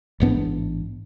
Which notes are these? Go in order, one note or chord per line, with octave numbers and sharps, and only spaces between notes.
A1 G#2 B3 D4